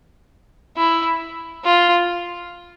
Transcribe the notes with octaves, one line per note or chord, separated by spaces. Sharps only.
E4
F4